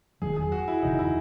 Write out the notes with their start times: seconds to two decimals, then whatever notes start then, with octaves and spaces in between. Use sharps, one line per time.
0.22 F#1 E2 D#3 F#3 G#4
0.36 G#4
0.52 F#4
0.68 E4
0.83 F#1 E2 C#3 E3 D#4
0.99 E4